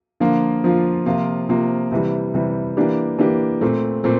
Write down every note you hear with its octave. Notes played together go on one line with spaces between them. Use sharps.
D3 F3 A#3 F4
D3 F3 A#3 F4
C3 F3 A#3 F4
C3 F3 A#3 F4
C3 E3 G3
C3 E3 G3
E3 A#3 D4 G4
E3 A#3 D4 G4
A#2 A3 C4
A#2 A3 C4